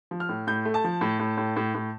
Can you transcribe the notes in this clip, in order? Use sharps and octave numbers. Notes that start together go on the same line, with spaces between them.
F3
F6
A2
A2 G6
A3
A5
F3
A2
A2
A2
A2
A2